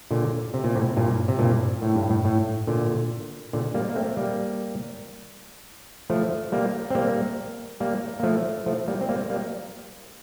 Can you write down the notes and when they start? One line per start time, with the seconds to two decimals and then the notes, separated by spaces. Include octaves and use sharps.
0.11 A#2 D3
0.54 C3
0.64 A#2
0.75 A2 C3
0.97 G2 A#2
1.28 C3
1.39 G2 A#2
1.82 A2
1.95 G2
2.10 A2
2.25 A2
2.67 A#2 D3
3.53 A#2 D3
3.74 G3 A#3
3.89 A#3
3.96 A3 C4
4.17 G3 A#3
6.10 F3 A3
6.52 G3 A#3
6.90 C4
6.95 G3 A#3
7.80 G3 A#3
8.20 A#3
8.23 F3 A3
8.66 F3 A3
8.87 G3 A#3
9.01 C4
9.09 G3 A#3
9.30 G3 A#3